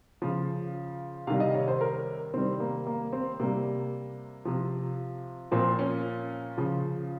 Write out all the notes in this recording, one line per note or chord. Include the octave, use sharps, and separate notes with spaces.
C#3 F3
C3 D#3 G3 F5
D#5
C#5
C5
A#4
C3 D#3 G3 C4
A#3
A#3
C4
C3 G3 A#3
C3 F3
A#2 F3 C4
C#4
C#3 F3